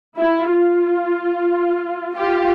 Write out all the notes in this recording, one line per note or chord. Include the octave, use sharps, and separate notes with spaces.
E4
F4
F4 G4